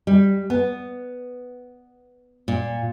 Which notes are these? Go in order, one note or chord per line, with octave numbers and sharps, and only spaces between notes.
G3
B3
A#2